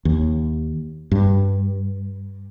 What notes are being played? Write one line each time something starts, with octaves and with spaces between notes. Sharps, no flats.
D#2
G2